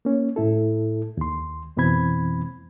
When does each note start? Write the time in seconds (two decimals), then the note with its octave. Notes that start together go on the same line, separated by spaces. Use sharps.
0.05 A#3 C#4
0.36 A2 E4 A4
1.17 D#2 C6
1.77 F2 B2 E3 C4 B5 G#6